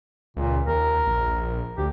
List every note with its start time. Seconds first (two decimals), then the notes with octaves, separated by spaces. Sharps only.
0.37 C#2 A#2
0.67 D#2 A#4
1.07 A#1
1.78 D2 G4